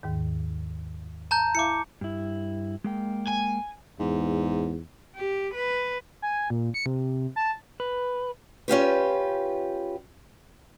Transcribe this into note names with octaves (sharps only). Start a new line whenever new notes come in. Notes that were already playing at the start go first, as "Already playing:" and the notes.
D#2 G#2 D#3
A5 A#5 G6
E4 E5 F5 D6 C#7
G2 E4
G#3 A#3 G5
G#5
E2 G#2
G4
B4
G#5
A#2
C#7
C3
A5
B4
C#4 F4 G4 B4